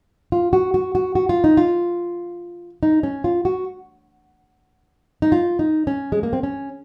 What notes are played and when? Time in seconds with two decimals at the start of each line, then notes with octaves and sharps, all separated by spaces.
0.32 F4
0.53 F#4
0.74 F#4
0.95 F#4
1.15 F#4
1.29 F4
1.44 D#4
1.57 F4
2.83 D#4
3.03 C#4
3.24 F4
3.45 F#4
5.22 D#4
5.32 F4
5.59 D#4
5.87 C#4
6.12 G#3
6.23 A#3
6.33 C4
6.43 C#4